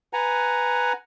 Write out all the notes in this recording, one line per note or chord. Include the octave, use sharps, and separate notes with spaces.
B4 F#5 G#5 A#5